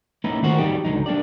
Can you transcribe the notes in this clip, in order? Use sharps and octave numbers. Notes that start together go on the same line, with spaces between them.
A#3 C#4 D#4 E4 B4
D#3 A3 F4 F#4 A#4 C5
F#3 G3 D#4 G4
C#2 D3 F#3 D#4
A#3 D4 G4 D5